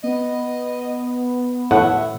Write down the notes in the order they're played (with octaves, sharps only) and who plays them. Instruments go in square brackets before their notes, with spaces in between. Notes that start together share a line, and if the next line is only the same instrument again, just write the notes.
[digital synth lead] B3 [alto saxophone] D#5
[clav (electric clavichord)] A2 [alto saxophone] E5 [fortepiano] F#5